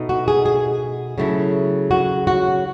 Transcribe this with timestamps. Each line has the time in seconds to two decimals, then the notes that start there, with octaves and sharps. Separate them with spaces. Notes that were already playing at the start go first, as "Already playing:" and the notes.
Already playing: B2 A3 D#4
0.09 F#4
0.28 G#4
0.46 G#4
1.18 C#3 F#3 A3 E4
1.91 F#4
2.27 F#4